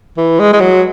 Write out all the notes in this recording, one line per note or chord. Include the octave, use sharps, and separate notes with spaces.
E3
G#3
G#3
F#3